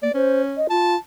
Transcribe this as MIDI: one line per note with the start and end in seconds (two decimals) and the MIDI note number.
0.02 0.12 58
0.02 0.12 74
0.14 0.63 61
0.14 0.41 72
0.57 0.67 75
0.70 0.96 65
0.70 0.97 81